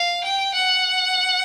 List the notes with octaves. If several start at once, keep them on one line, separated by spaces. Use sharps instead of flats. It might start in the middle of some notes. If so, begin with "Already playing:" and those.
Already playing: F5
G5
F#5